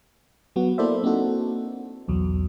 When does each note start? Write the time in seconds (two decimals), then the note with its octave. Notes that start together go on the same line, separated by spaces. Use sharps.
0.56 F#3 B3 F#4
0.78 A#3 E4 A4 C5 D5 E5
1.03 A#3 C4 D4 D#4 F#4 A4
2.08 B1 E2 F#3